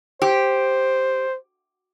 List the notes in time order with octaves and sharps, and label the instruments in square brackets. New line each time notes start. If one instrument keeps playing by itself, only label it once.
[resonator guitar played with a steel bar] G4 [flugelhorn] C5